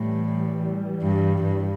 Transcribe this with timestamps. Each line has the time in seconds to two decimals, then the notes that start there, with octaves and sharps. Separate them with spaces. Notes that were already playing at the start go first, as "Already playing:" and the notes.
Already playing: A2 E3 G3
1.03 G2
1.44 G2